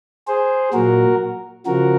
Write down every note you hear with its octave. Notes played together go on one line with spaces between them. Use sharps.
G#4 C5
A#2 F#3 F#4 A#4
C#3 F3 F#4 A#4